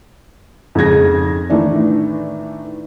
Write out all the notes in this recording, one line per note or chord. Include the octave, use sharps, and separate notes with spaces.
F2 G#2 C#3 G#6 A#6
A2 D#3 E3 A3 D4